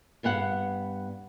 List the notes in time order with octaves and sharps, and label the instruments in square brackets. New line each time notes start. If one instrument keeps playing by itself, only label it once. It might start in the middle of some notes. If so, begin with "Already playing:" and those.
[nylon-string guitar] G2 B3 F5 F#5